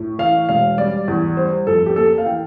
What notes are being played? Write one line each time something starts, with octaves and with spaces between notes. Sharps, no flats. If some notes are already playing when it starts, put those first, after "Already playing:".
Already playing: A2
E3 F5
E1 F5
G3 D5
E2
G3 C5
F2 A4
G4
A#3 A4
F5
E3 G5